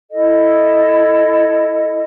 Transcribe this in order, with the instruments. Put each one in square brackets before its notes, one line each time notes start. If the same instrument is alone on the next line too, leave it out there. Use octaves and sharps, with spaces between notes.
[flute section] E4 A4 D#5